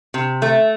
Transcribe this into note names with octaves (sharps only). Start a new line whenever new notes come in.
C3
A3